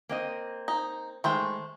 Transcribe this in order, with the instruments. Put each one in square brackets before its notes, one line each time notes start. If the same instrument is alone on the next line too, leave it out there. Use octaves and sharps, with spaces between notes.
[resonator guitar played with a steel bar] A#3 C4 D#5
[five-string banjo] D#4
[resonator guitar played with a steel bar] D#3 G#3 [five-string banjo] A3 C5 G5